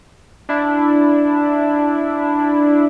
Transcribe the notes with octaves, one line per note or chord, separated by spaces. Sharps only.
D4 E4